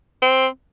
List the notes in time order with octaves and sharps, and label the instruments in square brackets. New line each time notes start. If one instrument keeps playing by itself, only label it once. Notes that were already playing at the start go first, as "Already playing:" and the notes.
[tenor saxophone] C4